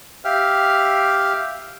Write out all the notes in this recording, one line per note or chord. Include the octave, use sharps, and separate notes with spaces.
G4 E5 F5 G5 F6